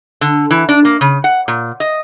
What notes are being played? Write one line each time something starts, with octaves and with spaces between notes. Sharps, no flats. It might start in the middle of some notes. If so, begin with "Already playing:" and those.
D3
E3
D4
A#3
C#3
F#5
A#2
D#5